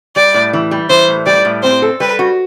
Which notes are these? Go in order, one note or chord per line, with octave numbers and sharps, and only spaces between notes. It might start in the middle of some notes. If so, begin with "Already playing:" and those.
G3 D5
A2
E3
G3
E3 C5
A2
G3 D5
A2
C4 C5
A4
G3 B4
F#4